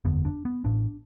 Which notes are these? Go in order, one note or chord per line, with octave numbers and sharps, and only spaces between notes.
F#1 E2 D3 B3
D4
B3
A1 A2 D4